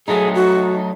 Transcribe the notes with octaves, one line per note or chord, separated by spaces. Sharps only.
F#3 A3 D#4 G#4
F#4